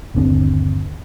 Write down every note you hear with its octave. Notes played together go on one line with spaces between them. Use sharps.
G1 D#2 D3 C4